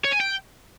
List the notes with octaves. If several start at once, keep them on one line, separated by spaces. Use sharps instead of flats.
C#5
G#5
G5